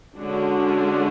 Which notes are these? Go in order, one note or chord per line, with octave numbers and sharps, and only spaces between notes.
D3 G#3 C#4 D4 F#4